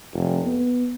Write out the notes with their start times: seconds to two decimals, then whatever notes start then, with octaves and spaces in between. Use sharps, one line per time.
0.14 F1
0.46 B3